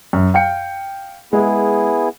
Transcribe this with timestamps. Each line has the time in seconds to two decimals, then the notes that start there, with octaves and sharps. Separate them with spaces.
0.13 F#2
0.34 F5 G5 C#7
1.33 G#3 B3 E4 G#4